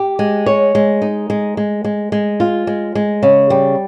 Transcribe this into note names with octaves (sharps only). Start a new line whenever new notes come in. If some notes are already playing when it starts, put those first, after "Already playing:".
Already playing: G4
G#3
C#5
G#3
D#4
G#3
G#3
G#3
G#3
F4
G#3
G#3
C#3
G3